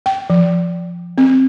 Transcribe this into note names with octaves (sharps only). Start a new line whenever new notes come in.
G5
F3
C4